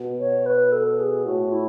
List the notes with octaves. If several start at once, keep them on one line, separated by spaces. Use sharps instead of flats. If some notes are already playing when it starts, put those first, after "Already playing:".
Already playing: B2
C#5
B4
A4
G#4
A2 F#4
E4